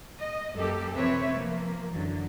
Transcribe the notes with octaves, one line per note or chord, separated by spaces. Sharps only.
D#5
F#2 F#3 A#3 G4 A4
C3 F3 C4 B4 C#5 E5
F3 A#3
F#2 D3 E3 F#3